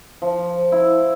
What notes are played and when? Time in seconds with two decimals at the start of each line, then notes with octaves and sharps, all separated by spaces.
0.22 F3
0.72 E4